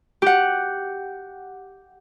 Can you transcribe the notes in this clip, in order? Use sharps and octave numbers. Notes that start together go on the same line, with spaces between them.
G4 F#5